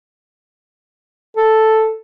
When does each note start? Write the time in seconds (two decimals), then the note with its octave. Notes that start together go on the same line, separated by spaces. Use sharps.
1.37 A4